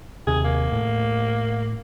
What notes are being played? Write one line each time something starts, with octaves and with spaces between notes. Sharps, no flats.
D#2 C3 G#4
A#3
A2